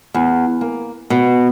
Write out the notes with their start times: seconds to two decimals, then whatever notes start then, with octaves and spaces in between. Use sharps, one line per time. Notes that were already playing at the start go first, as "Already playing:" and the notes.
0.14 E2
0.61 A#3
1.10 B2